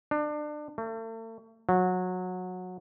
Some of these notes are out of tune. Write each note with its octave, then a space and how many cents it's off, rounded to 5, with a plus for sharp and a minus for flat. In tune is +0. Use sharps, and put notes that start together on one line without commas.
D4 +30
A3 +40
F#3 -20